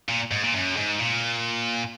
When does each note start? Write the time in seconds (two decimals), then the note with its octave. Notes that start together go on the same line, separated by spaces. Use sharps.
0.09 A#2
0.32 G#2
0.43 A#2
0.54 F#2
0.77 G#2
0.99 A#2